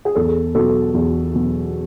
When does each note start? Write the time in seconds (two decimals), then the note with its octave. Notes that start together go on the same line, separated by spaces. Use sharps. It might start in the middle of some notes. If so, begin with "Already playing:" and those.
0.05 G#4
0.15 E2 A4
0.55 B2 F#3 A4
0.94 E2
1.33 B2 F#3